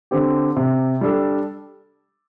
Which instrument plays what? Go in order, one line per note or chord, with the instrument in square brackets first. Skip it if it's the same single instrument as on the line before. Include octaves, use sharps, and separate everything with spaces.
[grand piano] D3 C4 G4
C3
G3 D4 A4